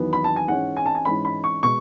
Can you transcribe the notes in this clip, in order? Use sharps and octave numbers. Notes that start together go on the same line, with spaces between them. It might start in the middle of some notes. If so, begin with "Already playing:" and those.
Already playing: E2 D#3 F#3 B3
B5
A5
G#5
G#2 E3 G#3 C#4 F#5
G#5
A5
G#5
G#2 E3 G#3 C#4 B5
B5
C#6
B2 G#3 C#6